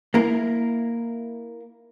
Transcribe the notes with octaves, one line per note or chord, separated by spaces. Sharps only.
A#3 E4 A#4